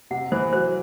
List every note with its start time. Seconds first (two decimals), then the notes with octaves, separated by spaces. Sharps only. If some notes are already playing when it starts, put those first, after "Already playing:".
0.11 C3 F#5
0.32 E3 C5
0.53 F#3 C5